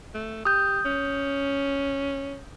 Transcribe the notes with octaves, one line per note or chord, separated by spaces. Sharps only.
A3
G4 D#6 G6
C#4